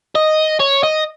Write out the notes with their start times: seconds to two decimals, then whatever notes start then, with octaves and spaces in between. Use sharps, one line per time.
0.15 D#5
0.60 C#5
0.83 D#5